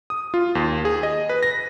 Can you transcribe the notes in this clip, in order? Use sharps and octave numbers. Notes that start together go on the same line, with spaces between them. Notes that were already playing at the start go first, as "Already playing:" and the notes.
D#6
F4
D#2
G#4
D#5
B4
A#6